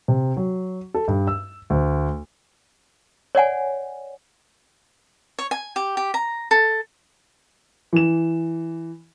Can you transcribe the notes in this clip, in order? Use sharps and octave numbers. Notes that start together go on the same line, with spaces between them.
C3
F#3
A4
G2
E6
D2
C#5 D5 F#5 G#5
C#5
G#5
G4
G4
A#5
A4
E3 E7